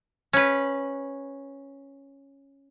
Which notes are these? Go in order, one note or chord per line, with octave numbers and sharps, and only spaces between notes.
C#4 B4